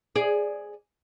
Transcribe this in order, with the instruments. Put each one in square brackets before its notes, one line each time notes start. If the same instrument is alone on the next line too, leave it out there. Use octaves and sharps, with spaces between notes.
[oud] G#4 D5